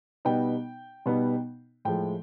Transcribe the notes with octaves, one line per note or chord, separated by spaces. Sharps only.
B2 G3 B3 D#4 G5
B2 G3 B3 D#4
A2 F3 G#3 G5